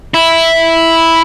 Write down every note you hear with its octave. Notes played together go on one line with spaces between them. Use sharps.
E4